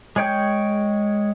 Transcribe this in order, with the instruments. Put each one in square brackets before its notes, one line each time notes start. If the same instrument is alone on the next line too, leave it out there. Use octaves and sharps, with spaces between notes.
[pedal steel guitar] G#3 G#4 C#5 G5 G6